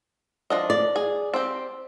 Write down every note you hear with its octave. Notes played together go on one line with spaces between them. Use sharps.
F3 D4 D#5
D5
G#4
C4 G4